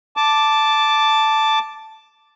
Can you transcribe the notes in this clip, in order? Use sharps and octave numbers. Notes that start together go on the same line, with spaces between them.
A5 D6